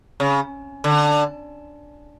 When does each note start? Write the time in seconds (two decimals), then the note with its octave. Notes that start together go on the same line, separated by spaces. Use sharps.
0.20 C#3
0.84 D3